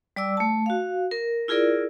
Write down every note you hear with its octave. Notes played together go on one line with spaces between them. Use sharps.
G3 D5 D6 E6
A3 A5
F#4 F5
A#4
E4 F4 G#4 A#4 D5